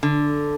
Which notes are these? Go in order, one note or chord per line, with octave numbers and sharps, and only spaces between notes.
D3